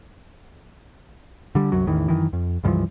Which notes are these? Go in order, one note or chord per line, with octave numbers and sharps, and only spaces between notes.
D3 G3
C2 F#2 F#3
A1 E2 D#3 E3
F#2 D#3 E3
F2
C#2 G2 E3 F3